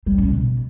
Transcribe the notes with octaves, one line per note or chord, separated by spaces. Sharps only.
G3
C#4
B2